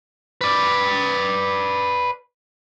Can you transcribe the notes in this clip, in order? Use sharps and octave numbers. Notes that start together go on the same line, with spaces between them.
B4 D5